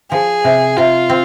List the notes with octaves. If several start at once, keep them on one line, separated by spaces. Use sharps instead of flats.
F3 G#4
C3
C3 F4
C4